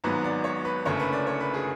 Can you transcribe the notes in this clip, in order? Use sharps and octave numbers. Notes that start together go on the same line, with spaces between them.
G#1 G#2 F#3 B3 B4
D5
C#5
B4
F#1 F#2 D3 A3 C#5
B4
D5
C#5
B4
G#4